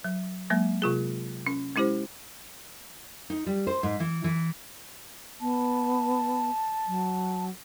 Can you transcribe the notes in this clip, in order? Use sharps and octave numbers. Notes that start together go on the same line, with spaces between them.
F#3
F#3 G#3 A#3
C3 F4 G#4
C#4
G#3 C#4 E4 G4 C5
D#4
G3
C5
G#2
E3
E3
B3 A5
F#3